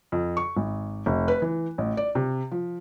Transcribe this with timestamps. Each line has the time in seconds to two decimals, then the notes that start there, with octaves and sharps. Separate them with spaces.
0.12 F2
0.37 C#6
0.57 G#1
1.06 F1
1.28 B4
1.42 E3
1.78 A1
1.97 D5
2.15 C3
2.51 F3